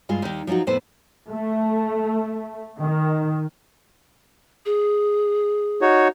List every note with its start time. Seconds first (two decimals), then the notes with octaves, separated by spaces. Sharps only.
0.09 G2 G#3 F4 G#4
0.22 D#2 D#3
0.47 F3 F#3 C#4 D#4 F#4
0.67 F2 A2 B3 B4 C5 A5
1.31 A3
2.80 D#3
4.66 G#4
5.81 D#4 F#4 C#5